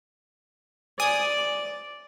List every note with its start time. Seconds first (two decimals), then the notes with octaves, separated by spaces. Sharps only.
1.00 D5 G#5 D#6